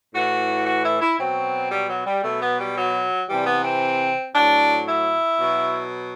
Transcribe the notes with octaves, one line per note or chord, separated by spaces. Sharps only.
A2 E3 F#4
F#4
E4
E4
B2 F#3 C4
G3
F#3
G3
B2 F#3 A3
B3
G3
F#3
C3 E3 G3
B3
C4
A2 F#3 D4
E4
B2 F#3